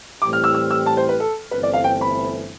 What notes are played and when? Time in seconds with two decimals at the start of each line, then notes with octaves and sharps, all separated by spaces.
0.22 A2 E3 G3 C4 G4 D6
0.33 F6
0.44 E6
0.54 E6
0.71 E6
0.86 A5
0.97 C5
1.09 B4
1.20 A4
1.51 G1 G2 E3 A3 C4 B4
1.63 D5
1.74 F5
1.84 G5
2.01 B5